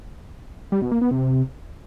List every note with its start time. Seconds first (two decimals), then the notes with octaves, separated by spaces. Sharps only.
0.72 G3
0.82 B2
0.92 A#3
1.01 B3
1.11 C3